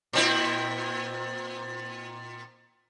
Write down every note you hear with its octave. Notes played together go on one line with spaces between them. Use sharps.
A#2 C4 E4